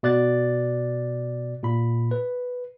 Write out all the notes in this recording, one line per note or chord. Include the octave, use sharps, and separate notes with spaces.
B2 D5 F#6 A6
A#2 B5
B4